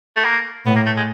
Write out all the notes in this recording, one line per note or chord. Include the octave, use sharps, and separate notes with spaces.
A3
A#3
A2 B3
A#3
A3
G#3